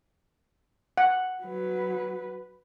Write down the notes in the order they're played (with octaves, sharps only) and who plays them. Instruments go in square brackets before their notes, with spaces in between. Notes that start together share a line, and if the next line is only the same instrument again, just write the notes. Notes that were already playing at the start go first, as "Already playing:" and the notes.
[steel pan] F#5
[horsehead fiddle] F#3 B4